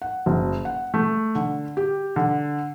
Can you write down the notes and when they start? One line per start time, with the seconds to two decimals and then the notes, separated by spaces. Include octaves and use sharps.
0.02 F#5
0.26 F#1
0.65 F#5
0.94 A3
1.35 D3
1.77 G4
2.16 D3